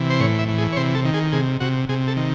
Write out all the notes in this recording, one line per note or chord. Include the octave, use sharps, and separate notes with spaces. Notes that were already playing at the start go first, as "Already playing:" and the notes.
Already playing: C3 E3
C5
A2 C#5
E5
E3
G#4
C#5
C3 C5
A4
D#3
G#4
C3 G#4
C3 F#4
C3 G#4
A4
D#3